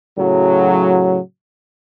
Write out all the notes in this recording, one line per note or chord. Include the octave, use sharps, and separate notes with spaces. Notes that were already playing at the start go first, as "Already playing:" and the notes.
A2 C#3 F#3